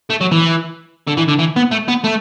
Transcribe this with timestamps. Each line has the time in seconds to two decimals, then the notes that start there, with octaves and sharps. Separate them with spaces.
0.10 A3
0.21 F#3
0.32 E3
1.07 D3
1.17 E3
1.28 D3
1.39 E3
1.56 B3
1.71 A3
1.88 B3
2.04 A3